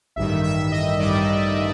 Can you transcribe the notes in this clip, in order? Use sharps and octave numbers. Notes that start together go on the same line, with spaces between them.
A1 G2 D#3 G3 E5
E5
D#5
A1 G2 D#3 G3 D5